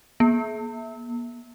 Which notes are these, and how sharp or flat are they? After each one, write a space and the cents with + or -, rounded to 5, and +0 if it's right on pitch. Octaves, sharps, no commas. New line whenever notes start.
A#3 +45